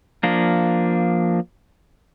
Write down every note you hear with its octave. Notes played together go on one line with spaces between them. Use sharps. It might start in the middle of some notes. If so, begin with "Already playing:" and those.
F3 A#3 D4